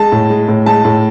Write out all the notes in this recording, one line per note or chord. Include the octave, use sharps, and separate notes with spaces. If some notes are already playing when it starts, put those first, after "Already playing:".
Already playing: G#3 A5
A2
G#3
A2
G#3 A5
A2